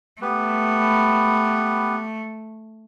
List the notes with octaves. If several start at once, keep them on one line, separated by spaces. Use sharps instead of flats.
A3 B3 G4 B4